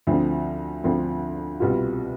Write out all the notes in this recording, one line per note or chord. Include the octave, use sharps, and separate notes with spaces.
D2 D3 F3 C4
D2 D3 F3 C4
C2 B2 G3 B3 F4